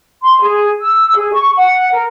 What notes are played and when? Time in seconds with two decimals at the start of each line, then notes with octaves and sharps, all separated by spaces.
0.23 C6
0.43 G#4
0.80 E6
1.16 G#4
1.33 C#6
1.57 F#5
1.93 A#4